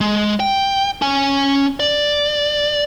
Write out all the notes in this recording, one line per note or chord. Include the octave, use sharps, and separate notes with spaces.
G#3
G5
C#4 G#5
D5